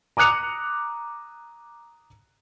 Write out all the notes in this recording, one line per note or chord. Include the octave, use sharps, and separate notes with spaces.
A#5 D6 D#6 F#6 C#7 F7